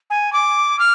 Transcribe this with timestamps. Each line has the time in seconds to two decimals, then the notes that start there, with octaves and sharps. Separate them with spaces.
0.10 G#5
0.33 D6
0.79 F6